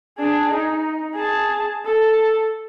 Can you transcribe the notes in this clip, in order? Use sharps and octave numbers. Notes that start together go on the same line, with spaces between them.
D4 G#4
D#4
G#4 A5
A4